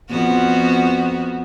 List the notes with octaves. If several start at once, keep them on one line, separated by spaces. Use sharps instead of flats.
F2 B3 F#4